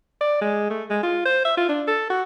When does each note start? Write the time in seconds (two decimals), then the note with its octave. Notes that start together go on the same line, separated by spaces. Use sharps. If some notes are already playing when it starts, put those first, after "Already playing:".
0.21 D5
0.42 G#3
0.70 A3
0.90 G#3
1.03 F4
1.26 C5
1.45 E5
1.57 F4
1.69 D4
1.88 A4
2.10 F#4